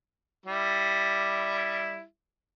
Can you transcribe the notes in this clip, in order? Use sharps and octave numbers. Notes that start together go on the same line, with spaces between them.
G3 E4